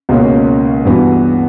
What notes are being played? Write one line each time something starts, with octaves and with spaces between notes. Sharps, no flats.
C#2 B2 A#3 C#4
G2 E3 B3 F#4